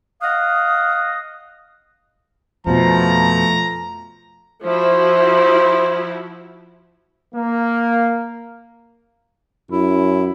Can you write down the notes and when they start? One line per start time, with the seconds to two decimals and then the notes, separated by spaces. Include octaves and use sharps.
0.21 D#5 F5 F#5 D#6
2.67 F2 B2 F3 A3 A#5
4.64 F3 E4 F#4 C5
7.34 A#3
9.71 F#2 E4